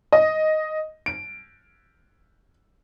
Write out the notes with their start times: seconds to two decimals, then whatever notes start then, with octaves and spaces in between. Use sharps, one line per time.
0.13 D#5
1.06 D7